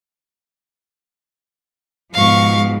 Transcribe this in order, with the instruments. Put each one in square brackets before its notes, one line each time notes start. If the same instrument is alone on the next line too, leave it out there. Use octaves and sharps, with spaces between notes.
[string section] G#2 B2 F3 [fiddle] F5 C#6